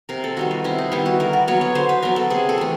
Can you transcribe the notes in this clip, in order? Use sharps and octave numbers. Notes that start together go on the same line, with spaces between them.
C3 A#4
A4
D#3 G3 B3 F#4
F4
C3 E4
D#4
D#3 G3 B3 E4
F#4
D3 A#4
D5
F#3 B3 C#5
C#5
D3 C5
B4
F#3 B3 A#4
A4
C3 G#4
A4
E3 A3